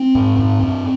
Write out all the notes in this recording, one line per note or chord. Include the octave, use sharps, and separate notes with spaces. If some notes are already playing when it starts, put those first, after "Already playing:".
Already playing: C4
G#2
G#2
G2